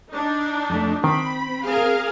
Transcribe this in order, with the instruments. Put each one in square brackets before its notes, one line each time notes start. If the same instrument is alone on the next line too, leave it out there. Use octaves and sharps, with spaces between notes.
[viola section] D4 D#4
[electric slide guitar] F2 A3
[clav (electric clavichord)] D#3 [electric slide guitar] C4 [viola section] B5
[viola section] G#4 A#4 F5